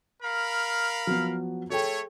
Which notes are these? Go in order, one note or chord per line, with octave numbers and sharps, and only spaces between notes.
A#4 F5 B5
F3 F#3 B3
A3 G#4 A4 C#5 G5